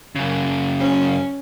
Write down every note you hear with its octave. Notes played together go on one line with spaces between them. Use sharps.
F#2 C#3
C#4